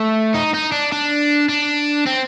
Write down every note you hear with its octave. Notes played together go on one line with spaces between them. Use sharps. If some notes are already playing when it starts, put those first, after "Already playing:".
Already playing: A3
D#4
D#4
D4
D4
D4
C4